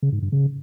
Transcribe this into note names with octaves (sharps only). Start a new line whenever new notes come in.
C#3
G#2
G2
C#3